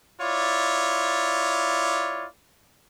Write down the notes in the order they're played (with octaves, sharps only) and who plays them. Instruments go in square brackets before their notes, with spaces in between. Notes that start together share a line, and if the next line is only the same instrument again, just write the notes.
[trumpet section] E4 F4 C#5 D5